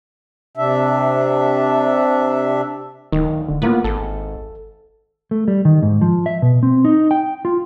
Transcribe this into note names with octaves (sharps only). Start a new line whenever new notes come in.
C3 D4 E5
D1 D#3
D3
A2 A#3 B3 F4
G#1 A4
A3
G3
D#3
G#2
F3
E5
B2
C4
D#4
G5
F4